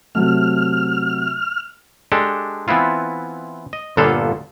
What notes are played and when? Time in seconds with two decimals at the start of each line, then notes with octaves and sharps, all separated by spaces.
0.15 C3 F#3 A3 F6
2.12 G#3 D4 G4 A4
2.68 E3 B3 C4 E4 F4
3.73 D#5
3.97 G1 A#2 D3 B3 A4 F5